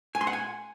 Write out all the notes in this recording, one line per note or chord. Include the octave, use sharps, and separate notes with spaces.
G#5
C6
F#5
G#5